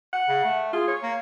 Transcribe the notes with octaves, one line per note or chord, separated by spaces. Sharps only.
F#5
C#3
A3
F4 G#4
C#5
A#3